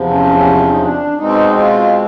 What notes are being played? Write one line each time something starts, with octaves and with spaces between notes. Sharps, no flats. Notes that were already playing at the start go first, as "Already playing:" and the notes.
Already playing: E2 C3 F3
C#4
C#4
D#4
D4
B2 G#3 C4 D#4
F4